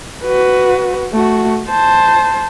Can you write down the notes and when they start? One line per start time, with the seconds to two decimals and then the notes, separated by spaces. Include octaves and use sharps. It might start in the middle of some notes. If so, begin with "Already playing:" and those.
0.24 F#4 B4
1.13 A3 F#4
1.69 C5 A5